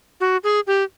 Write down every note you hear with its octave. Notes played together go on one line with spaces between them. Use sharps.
F#4
G#4
G4